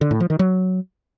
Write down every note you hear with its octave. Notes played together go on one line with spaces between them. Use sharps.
D3
A2
F3
D#3
F#3